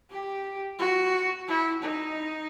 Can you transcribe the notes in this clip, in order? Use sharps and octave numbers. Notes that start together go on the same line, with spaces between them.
G4
F#4
E4
D#4